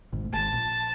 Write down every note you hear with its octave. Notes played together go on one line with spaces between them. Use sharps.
G#1 G#2
A2
G#1 G#2 A5
A#1 A#2